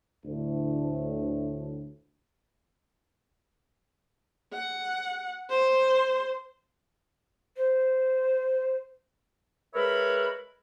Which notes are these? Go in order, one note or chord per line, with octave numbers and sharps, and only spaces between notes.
D2 A2
F#5
C5
C5
G#3 A#4 B4 C#5 E5 B5